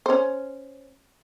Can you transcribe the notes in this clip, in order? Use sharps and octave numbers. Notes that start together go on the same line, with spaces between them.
C#4 C5